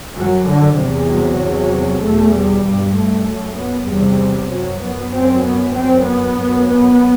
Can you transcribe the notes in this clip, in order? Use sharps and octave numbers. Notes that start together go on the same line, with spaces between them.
F#2 F#3
D3
E2 C3
F#3
E2 C3
E2 B2 A3
G3
G2
A3
F#2
B3
E2 C3 G3
F#2 F#3
B3
F#2 C4
B3
F#2 C4
B3
F#2
B3